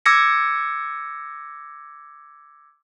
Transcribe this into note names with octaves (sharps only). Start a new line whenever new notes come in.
D6 E6 G#6 A#6 C#7